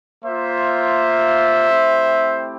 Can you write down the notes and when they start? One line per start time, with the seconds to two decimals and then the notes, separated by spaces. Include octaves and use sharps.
0.24 A#3 F4 C5 E5
1.69 A3 C4 E4 G4